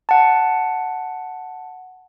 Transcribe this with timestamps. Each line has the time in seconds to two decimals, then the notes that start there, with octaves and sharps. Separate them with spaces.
0.09 F#5 A5